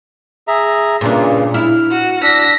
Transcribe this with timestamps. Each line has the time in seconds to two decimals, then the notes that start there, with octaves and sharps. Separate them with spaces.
0.48 G#4 E5 A#5
1.01 G2 A#2 C#3 D4
1.54 E4 F6
1.91 F#4
2.23 D4 E6 A#6 B6